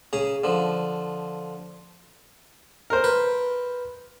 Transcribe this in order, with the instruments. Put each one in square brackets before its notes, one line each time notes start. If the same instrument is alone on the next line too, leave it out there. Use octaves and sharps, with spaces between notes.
[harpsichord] C#3 G#4 A#5
D3 F3
[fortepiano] A#4 C5
[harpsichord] B4